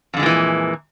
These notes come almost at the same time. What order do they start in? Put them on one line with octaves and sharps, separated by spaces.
F2 D3 G#3 A#2 E3